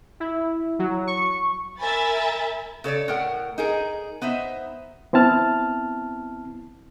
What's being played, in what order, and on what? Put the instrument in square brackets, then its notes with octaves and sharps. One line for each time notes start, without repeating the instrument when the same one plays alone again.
[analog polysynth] E4
F#3
C#6
[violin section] A#4 E5 G#5 B5 A6
[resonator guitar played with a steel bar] C#3 A4 C#5 D5
A2 A#4 F#5
D#4 G#4 A#4
B3 D#4 C5 E5
[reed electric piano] B3 C4 E4 A5 F6